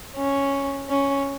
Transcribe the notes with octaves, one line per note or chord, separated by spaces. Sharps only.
C#4
C#4